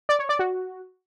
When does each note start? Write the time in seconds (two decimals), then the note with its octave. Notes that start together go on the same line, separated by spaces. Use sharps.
0.09 D5
0.19 C#5
0.29 D5
0.39 F#4